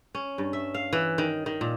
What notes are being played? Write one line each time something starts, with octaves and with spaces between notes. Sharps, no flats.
C#4
G2
E5
F5
E3
D#3
D#3
A#2